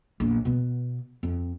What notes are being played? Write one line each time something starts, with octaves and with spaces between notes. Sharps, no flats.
A#1 E2
B2 B3
F2